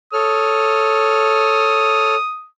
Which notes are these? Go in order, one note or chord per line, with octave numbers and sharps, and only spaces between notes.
A4 C#5 D#6 F6